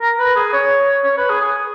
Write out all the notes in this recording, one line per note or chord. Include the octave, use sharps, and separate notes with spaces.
A#4
B4
G#4
C#5
C#5
B4
G#4
G#4